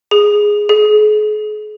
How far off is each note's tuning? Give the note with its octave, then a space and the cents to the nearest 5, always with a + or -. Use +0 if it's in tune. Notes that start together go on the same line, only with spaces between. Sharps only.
G#4 +0
G#4 +40